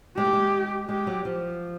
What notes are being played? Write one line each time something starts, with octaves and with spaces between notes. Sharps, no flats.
G#3 G4
A3
G#3
G#3 G4
F#3
F3